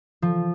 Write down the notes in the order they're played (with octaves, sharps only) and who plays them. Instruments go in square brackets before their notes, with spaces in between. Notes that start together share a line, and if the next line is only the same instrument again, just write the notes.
[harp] F3